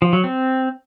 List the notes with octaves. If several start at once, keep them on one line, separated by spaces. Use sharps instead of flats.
F3
F#3
C4